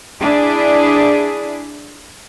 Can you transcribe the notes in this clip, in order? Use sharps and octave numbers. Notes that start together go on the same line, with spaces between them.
D4 E4 G#4 D5